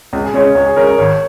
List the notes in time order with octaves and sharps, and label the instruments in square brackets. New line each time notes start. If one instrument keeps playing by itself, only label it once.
[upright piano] C#2
[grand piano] G#4
[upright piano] C#3 G#3 C#4 [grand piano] C#5
[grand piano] C#5
[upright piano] C#2 [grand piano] C#5
[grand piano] G#4
[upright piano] C#3 G#3 C#4 [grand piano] A#4
[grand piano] A#4
[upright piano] G#1 [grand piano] C#5